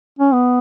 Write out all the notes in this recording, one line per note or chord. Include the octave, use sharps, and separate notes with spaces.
C#4
B3